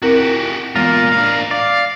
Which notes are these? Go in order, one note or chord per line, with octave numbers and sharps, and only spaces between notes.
C4 E4 F#4 G4 A#4
E3 G#3 A#3 B3 F4 A#4
D4 F5
D5 F5